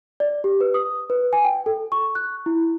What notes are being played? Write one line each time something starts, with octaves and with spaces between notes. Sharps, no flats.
D5
G4
B4
D#6
B4
G#5
G5
A4
C#6
F#6
E4